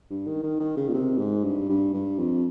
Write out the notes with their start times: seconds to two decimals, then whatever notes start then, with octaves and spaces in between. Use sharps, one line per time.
0.10 G2
0.27 D#3
0.43 D#3
0.60 D#3
0.77 C#3
0.89 A#2
0.94 C3
1.19 G#2
1.44 G2
1.69 G2
1.94 G2
2.19 F2